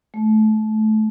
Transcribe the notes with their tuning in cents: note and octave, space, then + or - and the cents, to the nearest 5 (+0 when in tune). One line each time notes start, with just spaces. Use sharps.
A3 -25